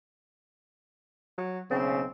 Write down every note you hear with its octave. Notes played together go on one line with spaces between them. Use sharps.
F#3
B1 C#3 C4